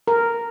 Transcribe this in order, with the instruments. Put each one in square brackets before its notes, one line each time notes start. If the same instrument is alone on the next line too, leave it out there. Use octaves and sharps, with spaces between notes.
[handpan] A#4